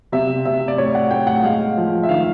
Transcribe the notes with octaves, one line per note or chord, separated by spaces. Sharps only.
C3 E5
C3 E5
D5
A2 C#5
F#5
A2 G5
F#5
G#3 F5
F3
E5
D#3 F5